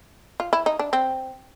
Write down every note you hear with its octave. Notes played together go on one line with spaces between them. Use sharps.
F4
E4
D#4
D4
C4